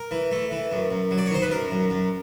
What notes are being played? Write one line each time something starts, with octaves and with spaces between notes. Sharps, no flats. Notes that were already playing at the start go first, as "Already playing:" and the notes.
Already playing: A#4
E3
A3
E3
F#2
F#2
F#3
D5
C#5
D#3 C5
B4
F#2 A#4
F#2
F#2